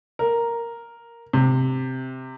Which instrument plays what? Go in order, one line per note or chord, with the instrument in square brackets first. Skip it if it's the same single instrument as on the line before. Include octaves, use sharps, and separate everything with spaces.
[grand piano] A#4
C3